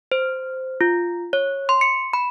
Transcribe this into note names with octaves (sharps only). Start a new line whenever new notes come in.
C5
F4
C#5
C6
C#7
B5